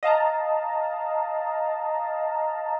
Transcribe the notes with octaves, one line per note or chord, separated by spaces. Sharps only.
D#5 F5 A5 A#5